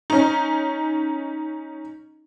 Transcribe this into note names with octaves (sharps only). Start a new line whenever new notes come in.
C#4 D#4